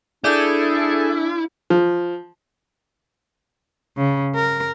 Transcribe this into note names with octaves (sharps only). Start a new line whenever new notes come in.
D4 E4 G#4 A4 D5 D6 G6
F3
C#3
A#4